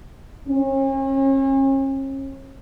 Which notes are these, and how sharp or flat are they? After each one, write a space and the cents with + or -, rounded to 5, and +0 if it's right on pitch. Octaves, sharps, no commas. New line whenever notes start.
C#4 -40